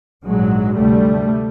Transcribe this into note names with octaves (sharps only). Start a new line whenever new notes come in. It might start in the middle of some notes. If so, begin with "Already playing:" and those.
A#1 G#2 F#3 G#3
D2 C3 G3 A3